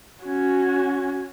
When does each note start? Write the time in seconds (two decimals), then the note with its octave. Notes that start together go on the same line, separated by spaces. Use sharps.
0.22 C#4 F#4